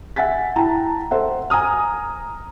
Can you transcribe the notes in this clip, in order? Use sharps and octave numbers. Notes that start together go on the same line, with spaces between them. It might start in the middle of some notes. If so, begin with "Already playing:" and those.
E5 F#5 G#5 A6 B6
E4 G5 A5 A#5
A4 C5 E5 F#5
G#5 A#5 D#6 F6